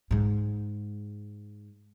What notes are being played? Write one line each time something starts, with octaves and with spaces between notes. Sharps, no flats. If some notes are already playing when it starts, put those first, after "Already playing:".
G#2 G#3